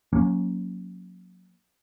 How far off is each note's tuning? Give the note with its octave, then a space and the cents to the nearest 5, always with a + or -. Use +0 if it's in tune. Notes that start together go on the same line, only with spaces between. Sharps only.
F#3 -25 A#3 +0 C#4 +0